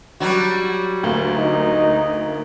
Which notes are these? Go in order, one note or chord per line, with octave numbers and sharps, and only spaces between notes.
F#3 G3 F#4
D2 A#3
D#4